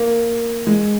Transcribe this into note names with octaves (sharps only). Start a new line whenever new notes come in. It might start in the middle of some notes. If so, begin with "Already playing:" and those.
Already playing: A#3
G#3